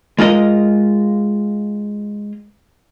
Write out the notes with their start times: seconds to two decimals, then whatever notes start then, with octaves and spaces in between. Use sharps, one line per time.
0.19 G#3 F4 A#4 D#5